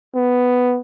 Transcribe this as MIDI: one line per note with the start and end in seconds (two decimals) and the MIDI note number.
0.15 0.80 59